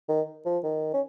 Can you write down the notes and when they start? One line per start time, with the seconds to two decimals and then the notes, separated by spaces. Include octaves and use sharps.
0.09 D#3
0.46 F3
0.64 D#3
0.94 C#4